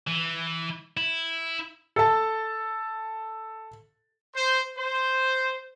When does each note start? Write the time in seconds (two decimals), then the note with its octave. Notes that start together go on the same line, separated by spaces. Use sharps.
0.07 E3
0.97 E4
1.96 A4 A5
4.36 C5
4.78 C5